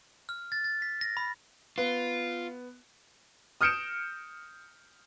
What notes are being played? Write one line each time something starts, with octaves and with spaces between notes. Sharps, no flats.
F6
A6
A6
B6
A#6
B5
B3 F4
D#6 F6 G6 C#7 D7 E7